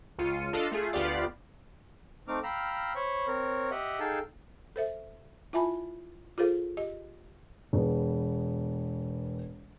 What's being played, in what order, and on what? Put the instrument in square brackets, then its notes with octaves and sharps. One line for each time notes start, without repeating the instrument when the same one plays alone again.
[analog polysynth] C#2 F4 C#7 D#7
D4 F4 A4 D#5 F5
A3 F4 G#4
D2 B3 F4 G4 D5 F5
[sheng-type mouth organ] A3 C4 D#4 D6 F6
F5 G5 A#5 B5 E6 F6
C5 C#5 B5 C#6
C4 A#4 C#5
G4 D#5 E5 F#5
D#4 G#4 A4 F5 G5 A5
[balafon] A4 C5 E5
E4 F4 E5 G#5 A5 B5
F4 G#4 A4 C5 F5
G4 D#5
[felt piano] E1 B3